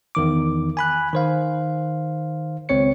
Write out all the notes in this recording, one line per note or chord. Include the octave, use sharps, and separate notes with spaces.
E2 D#3 D6
G#5 B5 F#6
D#3 C5 F5
C#2 C4 C#5 C#7